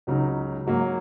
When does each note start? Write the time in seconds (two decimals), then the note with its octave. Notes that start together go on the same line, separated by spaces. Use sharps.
0.07 C#2 C#3 F#3 D#4
0.66 G#2 F#3 A#3